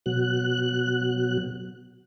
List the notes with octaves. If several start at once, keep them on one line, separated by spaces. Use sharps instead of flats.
B2 F#3 F#6